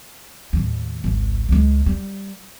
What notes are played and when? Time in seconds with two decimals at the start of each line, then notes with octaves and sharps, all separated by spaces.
0.53 D#2 A2
1.04 G#1 C#2
1.49 C#2 G#3
1.86 G3